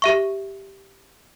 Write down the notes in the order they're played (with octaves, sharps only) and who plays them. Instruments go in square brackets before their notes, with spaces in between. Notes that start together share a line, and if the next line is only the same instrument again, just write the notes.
[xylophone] G4 E5 C#6